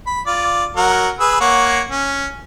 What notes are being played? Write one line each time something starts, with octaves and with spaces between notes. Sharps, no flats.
B5
F4 D5
F#3 A#4 F#5
G#4 B4 E6
A#3 C#5 F#5
C#4